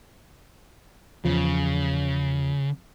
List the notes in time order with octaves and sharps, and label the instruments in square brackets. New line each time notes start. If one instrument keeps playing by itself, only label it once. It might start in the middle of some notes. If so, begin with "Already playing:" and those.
[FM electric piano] E2 F3 [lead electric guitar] C#3